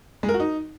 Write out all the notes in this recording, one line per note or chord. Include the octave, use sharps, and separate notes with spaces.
G#3
A#4
F#4
D#4